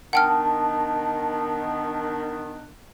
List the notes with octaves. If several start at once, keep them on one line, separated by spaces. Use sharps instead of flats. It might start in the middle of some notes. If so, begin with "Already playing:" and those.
D#3 B3 D4 F#5 G5 A5 F6